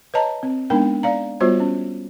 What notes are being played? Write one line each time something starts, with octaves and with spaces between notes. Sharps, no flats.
B4 C#5 D#5 A5 A#5
C4
G#3 B3 D4 D#4 A#4 G5
D5 F5 A#5
G3 B3 F4 F#4 C5 C#5
C#4